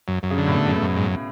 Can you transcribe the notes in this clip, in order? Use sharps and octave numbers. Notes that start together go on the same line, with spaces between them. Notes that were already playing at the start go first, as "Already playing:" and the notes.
F#2
F#2
C#3
D3
A2
B2 A3
F#2 C#3
B2
F#2
G#2